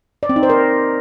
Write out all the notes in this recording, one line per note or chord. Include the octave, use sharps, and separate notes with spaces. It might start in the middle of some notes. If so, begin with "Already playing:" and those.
D5
C4
D#4
C5
A#4